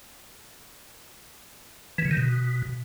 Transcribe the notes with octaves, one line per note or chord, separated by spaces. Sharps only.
E3
C#3
D#3
B2